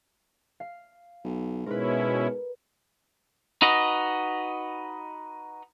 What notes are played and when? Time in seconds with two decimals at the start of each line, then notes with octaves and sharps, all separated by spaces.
0.60 F5
1.24 B1
1.66 G#2 B2 C#4 E4 A#4 B4
3.62 D#4 F#4 B4 D#5